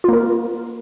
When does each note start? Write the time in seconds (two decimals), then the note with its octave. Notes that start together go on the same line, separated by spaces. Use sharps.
0.04 F4
0.09 A#3
0.13 A#4